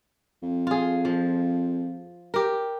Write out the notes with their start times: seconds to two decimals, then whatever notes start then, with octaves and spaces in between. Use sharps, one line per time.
0.43 F2
0.67 F4 G#4
1.05 F3
2.34 G4 A#4